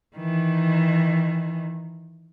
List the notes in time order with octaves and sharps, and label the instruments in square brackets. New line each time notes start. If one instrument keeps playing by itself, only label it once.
[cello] D#3 E3